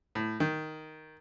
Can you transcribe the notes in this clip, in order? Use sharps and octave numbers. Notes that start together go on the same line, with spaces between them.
A2
D#3